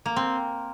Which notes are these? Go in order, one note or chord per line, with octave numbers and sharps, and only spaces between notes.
A#3
C4